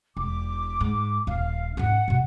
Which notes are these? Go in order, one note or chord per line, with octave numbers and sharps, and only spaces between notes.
E1 D6
G#2
D#1 D4 F5
G#2 C#4 F#5
G2 B2